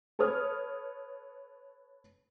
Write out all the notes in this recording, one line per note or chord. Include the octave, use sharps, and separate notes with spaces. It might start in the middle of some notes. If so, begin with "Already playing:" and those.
A4 B4 C#5 D#6 F6